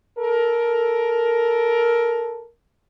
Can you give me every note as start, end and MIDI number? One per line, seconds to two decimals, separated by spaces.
0.19 2.46 69
0.19 2.46 70